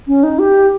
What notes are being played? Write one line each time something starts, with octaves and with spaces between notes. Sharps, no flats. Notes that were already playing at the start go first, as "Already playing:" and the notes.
C#4
D#4
G4